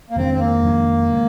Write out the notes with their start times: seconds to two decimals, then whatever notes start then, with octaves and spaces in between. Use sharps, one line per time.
0.10 A#3
0.16 F2 D#3 G#3 C4 D4
0.34 C4
0.39 A#3
0.62 F2 D#3 G#3 D4
1.12 D#3 G#3